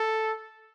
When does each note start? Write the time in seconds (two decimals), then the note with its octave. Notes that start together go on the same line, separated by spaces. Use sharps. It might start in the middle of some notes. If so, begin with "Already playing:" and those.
Already playing: A4